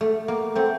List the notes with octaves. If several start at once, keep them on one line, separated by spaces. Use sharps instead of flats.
A3
A#3
A3 C4